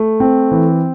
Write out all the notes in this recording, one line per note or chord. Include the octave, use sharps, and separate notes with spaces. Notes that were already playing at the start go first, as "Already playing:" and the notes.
Already playing: A3
C4
E3